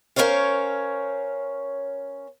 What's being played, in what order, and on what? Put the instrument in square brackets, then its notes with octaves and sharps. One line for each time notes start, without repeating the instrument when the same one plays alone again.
[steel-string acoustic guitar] C#4 A#4 C5 C#5 F5